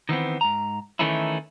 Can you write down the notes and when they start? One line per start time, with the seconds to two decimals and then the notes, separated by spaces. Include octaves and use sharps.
0.09 D#3 E3 B3 C4
0.41 G#2 A#5
0.99 D#3 E3 A3 C#4 D#4 E4